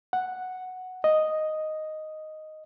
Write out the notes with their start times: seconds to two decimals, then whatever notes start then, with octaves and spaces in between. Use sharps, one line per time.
0.13 F#5
1.04 D#5